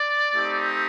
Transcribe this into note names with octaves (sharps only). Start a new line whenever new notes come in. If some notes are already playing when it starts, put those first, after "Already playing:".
Already playing: D5
A3 C4 D#4 G4